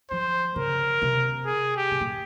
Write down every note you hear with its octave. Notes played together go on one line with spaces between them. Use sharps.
F3 C5
C#3 A#4
C3
G#4
G4
C3
A#2